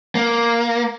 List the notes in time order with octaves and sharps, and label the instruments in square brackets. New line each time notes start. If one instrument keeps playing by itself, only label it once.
[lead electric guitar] A#3